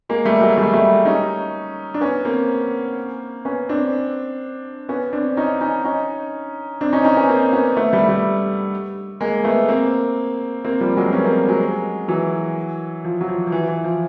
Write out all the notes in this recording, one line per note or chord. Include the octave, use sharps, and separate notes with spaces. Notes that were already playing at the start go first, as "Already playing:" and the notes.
G#3 A#3
G3 A3
F#3 G#3
G3 A3
G3 A3
C#4 D#4
D4
B3 C#4
A#3 C4
B3 C#4
C4 D4
B3 C#4
C4 D4
C#4 D#4
C#4 D#4
C#4 D#4
C4 D4
C#4 D#4
C#4 D#4
B3 C#4
A#3 C4
B3 C#4
A3 B3
G3 A3
G3 A3
G#3 A#3
A3 B3
A#3 C4
A#3 C4
F3 G3
F#3 G#3
B3 C#4
A#3 C4
F#3 G#3
E3 F#3
F3
F#3
F3
F3
E3
E3
F3